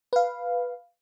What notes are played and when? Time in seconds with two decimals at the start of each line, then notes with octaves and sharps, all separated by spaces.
0.13 B4 F5